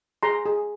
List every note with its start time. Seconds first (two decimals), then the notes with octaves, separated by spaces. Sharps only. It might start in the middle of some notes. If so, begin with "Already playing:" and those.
0.23 G#4 A#5 C6
0.46 G#4